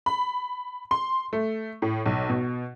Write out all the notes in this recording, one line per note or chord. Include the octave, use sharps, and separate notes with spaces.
B5
C6
A3
A2
B1
B2